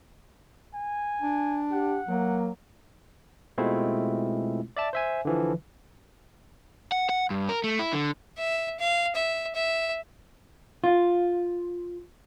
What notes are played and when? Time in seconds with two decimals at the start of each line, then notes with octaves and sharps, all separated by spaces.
0.74 G#5
1.22 D4
1.72 G4 F#5
2.09 F#3 A#3
3.58 B2 G#3 A3 C4 E4 F4
4.77 D5 E5 A5
4.93 C5 E5 G#5
5.25 D3 E3 F3
6.92 F#5
7.09 F#5
7.30 G2
7.49 A#4
7.64 A3
7.79 E4
7.93 D3
8.38 E5
8.80 F5
9.15 E5
9.55 E5
10.84 F4